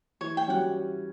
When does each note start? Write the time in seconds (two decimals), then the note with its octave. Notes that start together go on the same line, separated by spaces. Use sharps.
0.21 E3 C#5
0.37 G5
0.48 G3 C#4 F#4 F#5